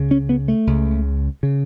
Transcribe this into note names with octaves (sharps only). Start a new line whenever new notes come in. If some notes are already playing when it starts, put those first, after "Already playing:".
Already playing: C#2 C#3
C#4
B3
A3
C#2 C#3
C#3